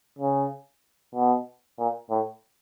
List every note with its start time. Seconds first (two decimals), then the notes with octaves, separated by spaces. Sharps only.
0.19 C#3
1.15 B2
1.79 A#2
2.10 A2